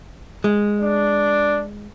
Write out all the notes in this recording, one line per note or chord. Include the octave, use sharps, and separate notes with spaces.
G#3
D4